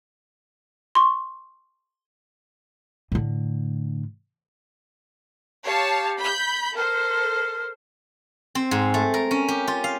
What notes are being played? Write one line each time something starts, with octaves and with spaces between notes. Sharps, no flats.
C6 C#6
A2 D3
G4 C#5 F5 A5
B5 G6
A4 A#4 C5
C4
G#2
A3
A#4
C#4
G4
F4
F5